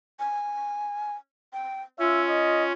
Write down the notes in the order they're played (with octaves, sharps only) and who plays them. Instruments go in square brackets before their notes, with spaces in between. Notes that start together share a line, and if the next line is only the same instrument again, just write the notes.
[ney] G#5
G5
[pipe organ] C#4 [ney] F4 [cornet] E5
[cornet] D#5